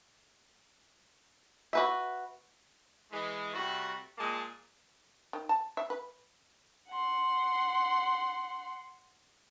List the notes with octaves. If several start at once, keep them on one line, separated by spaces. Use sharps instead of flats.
F#4 B4 E5
E3 G#3
C3 G3 A3 F#4
A#2 G#3 A#3 G#4 D#5 A5
D#3
A5
E5
B4
F#5 C6